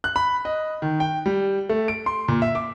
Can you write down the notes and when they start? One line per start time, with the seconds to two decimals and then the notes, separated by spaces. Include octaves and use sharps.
0.04 F#6
0.16 B5
0.45 D#5
0.82 D#3
1.00 G5
1.26 G3
1.69 A3
1.88 D7
2.06 C6
2.28 A#2
2.42 E5
2.55 D6